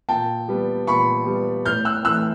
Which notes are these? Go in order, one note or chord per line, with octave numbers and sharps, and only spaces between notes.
A#2 G5 A5
G3 B3
A#2 B5 C#6
G3 B3
A2 F6 G6
E6 F#6
E3 A3 E6 F#6